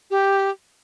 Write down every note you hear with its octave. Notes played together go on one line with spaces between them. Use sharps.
G4